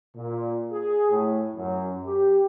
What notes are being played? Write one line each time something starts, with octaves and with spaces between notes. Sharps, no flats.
A#2
G#4
A2
F#2
G4